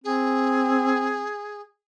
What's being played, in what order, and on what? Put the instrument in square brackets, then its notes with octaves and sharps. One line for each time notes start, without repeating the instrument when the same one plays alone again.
[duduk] C4 [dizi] G#4